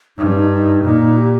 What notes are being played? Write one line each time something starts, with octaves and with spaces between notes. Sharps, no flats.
G2 D#4
C#4
D#4
D#4
A#2 D#4
D#4
G4